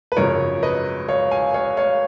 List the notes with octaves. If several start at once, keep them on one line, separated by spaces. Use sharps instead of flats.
B4
G#1 F#2 C#3 F3 A#4 C#5
B4 D#5
C#5 F5
F5 G#5
C#5 F5
C#5 F5